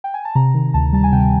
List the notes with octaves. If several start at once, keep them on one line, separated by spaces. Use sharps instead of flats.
G5
G#5
A5
C3 A#5
D#3
D2 A5
G3 A5
G#5
C3 G5